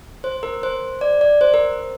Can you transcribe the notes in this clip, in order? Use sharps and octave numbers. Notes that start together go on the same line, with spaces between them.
C5
A#4
C5
D5
D5
C5
A#4